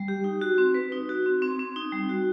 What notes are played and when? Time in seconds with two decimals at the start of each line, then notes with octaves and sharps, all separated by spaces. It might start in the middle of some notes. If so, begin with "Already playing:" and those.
Already playing: G3
0.08 G4
0.24 D#4
0.41 F#4
0.58 C4
0.74 B4
0.92 D#4
1.09 F#4
1.26 C4
1.42 C4
1.59 C4
1.76 D#4
1.92 G3
2.09 F#4